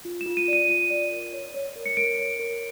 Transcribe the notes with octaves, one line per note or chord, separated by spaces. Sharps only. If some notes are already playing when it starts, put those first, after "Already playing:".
F4
E7
F4
D#7
D5
D#7
F4 D#7
D5
A#4
C#5
C#5
A#4
C#7
A#4 D7
C#5
A#4